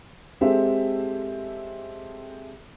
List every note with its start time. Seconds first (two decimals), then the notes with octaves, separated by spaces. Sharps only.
0.41 G#3 C4 G4 A4 E5